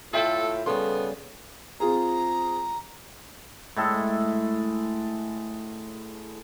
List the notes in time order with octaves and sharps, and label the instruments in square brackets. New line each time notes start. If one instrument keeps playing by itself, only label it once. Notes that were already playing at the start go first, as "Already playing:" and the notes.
[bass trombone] A2 [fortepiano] F4 E5 G5 [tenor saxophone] A4
[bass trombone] C#3 [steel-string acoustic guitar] G3 A4 [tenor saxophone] B3 [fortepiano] C6
[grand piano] C4 F4 G#4 [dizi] A#5
[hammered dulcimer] A2 G#3 A4